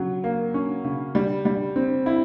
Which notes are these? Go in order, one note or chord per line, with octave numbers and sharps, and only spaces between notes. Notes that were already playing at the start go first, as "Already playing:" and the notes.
Already playing: C#3 F#3
A#3
C#4
C#3
G3
G3
C4
E4